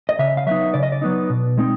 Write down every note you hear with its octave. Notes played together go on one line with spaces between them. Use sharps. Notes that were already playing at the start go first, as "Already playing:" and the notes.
D#5
C#3 E5
F5
F#3 B3 D#4 E5
C#3 D5
D#5
D5
F#3 B3 D#4
B2
G#3 C4 D#4